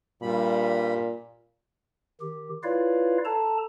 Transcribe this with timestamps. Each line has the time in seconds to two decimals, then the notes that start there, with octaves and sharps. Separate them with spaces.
0.22 G2 A#2 G3 B5
2.21 D#3 G4
2.63 E4 F4 B4 C#5 D5 F5
3.25 A4 A5 A#5